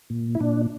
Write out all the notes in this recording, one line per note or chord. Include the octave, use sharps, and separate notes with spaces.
A#2
E4
A#2 D4